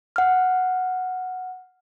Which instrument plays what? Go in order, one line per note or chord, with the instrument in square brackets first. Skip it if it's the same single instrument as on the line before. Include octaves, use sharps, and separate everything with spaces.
[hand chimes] F#5 F6